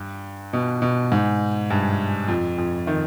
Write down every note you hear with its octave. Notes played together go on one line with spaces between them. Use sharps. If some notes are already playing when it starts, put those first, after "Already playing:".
Already playing: G2
B2
B2
G#2
G2
F2
F2
D#3